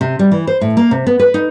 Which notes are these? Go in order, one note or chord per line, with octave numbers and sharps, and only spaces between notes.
C3
G3
E3
C5
A2
A#3
C3
B3
B4
D#4